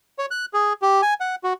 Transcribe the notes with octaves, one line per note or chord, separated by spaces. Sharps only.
C#5
F#6
G#4
G4
G#5
F#5
F#4